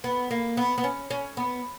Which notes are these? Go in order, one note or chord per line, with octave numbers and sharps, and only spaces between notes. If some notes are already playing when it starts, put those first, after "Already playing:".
B3
A#3
B3
B3
C#4
C#4
B3